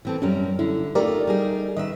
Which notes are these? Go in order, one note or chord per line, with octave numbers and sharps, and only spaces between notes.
E3 C4 A4
F#2 G3 C#4 A#4
D3 E4
A3 D#4 F4 G4 A#4 D5
G3 D#4 G#4
D#3 B4 D#5 E5